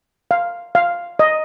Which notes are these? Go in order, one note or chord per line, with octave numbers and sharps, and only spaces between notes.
F5
F5
D#5